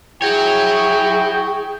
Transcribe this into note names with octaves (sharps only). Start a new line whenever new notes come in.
E4 F#4 G#4 C#5 G5